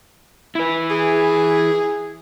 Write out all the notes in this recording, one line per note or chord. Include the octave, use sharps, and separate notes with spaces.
E4 B4
G#4